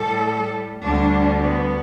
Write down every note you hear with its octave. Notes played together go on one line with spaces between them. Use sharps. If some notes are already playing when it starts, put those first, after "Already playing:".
Already playing: A2 G3 A4
D2 D3 G3 D4
B3